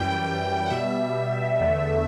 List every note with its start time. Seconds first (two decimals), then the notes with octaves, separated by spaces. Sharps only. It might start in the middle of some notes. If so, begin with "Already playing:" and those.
Already playing: F#2 E3 G3 G5
0.66 F#5
0.70 B2 G3 E5
1.60 E2 D3 A3